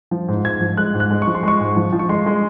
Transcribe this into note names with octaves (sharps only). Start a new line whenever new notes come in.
F3
G#2
G#2 G#6
F3
G#3 F#6
G#2
F#6
G#3
C#6
F3
C6
G#3 C#6
G#2
F3
F3
C#6
G#3 C6
G#3